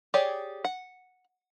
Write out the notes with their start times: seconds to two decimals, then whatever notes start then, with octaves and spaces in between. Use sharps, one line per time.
0.14 G4 G#4 C#5 D5
0.64 F#5